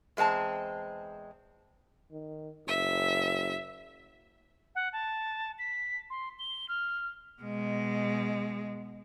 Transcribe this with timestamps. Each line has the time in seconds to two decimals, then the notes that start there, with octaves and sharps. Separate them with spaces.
0.17 E2 G#3 C4 A5 A#5
2.11 D#3
2.67 F#1 E5
4.75 F#5
4.93 A5
5.59 B6
6.10 C6
6.39 G7
6.69 F6
7.42 B2 G#3